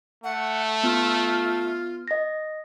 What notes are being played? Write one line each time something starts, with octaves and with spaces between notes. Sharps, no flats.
A3 F#5
B3 F4
D#5 A#6